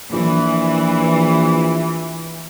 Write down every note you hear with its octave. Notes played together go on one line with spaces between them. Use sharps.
A#1 E3